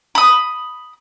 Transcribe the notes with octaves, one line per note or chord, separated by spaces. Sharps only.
B5 D#6